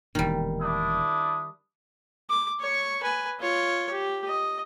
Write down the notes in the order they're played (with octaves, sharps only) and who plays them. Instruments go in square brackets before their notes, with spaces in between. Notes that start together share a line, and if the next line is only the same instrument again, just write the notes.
[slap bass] E1 E2 A#2 [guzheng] D#3 G3
[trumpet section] D4 E4 D#6
[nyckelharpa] D6
C#5 C#6
B4 G#5
F4 C#5
G4
D#5